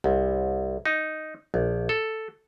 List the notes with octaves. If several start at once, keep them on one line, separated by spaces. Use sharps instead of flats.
C2
D#4
A#1
A4